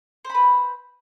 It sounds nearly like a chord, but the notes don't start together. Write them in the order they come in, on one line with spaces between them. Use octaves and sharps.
C5 B5 B4